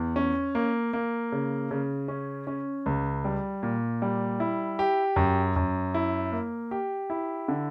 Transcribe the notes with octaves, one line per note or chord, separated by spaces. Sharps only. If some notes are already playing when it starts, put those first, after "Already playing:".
Already playing: E2
C#4
A#3
A#3
C#3
C#3
C#4
C#4
C#2
G3
A#2
G3
E4
G4
F#2
F#2
E4
A#3
G4
E4
D3